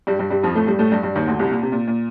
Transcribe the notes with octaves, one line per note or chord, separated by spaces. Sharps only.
G2 G3
G2 G3
G2 G3
F2 F3
A2 A3
G2 G3
A2 A3
G2 G3
G2 G3
D#2 D#3
D2 D3
C2 C3
A#2
C3
A#2
A#2